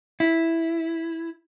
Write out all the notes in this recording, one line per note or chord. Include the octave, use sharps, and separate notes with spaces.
E4